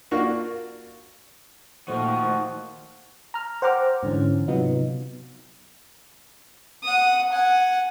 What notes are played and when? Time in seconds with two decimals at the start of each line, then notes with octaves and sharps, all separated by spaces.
0.11 A#3 D4 F4 F#4 C#6
1.88 A#2 D#3 F3 A3 F#4 C5
3.34 A#5 F6
3.62 C5 F#5 G5 A#5 D6 F6
4.03 G#2 D3 E3 C#4
4.48 C3 F#3 B3 D#4 F4
6.83 F#5 D#6
7.32 F#5 G#5